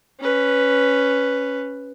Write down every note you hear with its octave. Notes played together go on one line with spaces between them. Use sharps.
C#4 B4